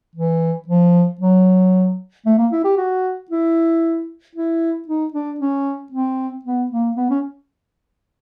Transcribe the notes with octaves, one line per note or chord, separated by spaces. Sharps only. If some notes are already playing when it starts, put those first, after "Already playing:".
E3
F3
F#3
A3
A#3
E4
G4
F#4
E4
E4
D#4
D4
C#4
C4
B3
A#3
B3
C#4